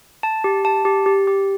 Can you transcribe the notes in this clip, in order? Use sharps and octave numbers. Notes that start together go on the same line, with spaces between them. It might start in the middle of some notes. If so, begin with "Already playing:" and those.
A5
G4
A5
G4
G4
G4